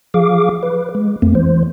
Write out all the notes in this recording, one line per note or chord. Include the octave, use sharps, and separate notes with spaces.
F3 G#4 F5 D6
B4
G#3
F2 A3 A#3 C4
E3 C5